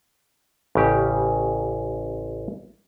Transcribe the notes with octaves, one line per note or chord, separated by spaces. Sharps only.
A1 C#3 G4